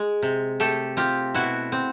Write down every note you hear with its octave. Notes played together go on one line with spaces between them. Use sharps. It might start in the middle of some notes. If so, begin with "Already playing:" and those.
Already playing: G#3
C3
A3 G4 A4
C4 F4 G4
B2 E4 F#4
C4